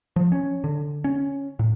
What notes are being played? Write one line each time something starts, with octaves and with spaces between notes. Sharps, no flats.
F3
C#4
D3
C#4
A2